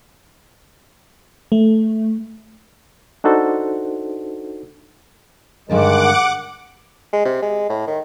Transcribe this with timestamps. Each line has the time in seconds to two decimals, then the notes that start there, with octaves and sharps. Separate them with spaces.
1.52 A3
3.24 D4 D#4 F#4 A4 C5
5.69 G2 D3 D#3 G#3 F#5 A5 D6
7.13 G#3
7.25 C3
7.42 G#3
7.70 A2
7.88 D#3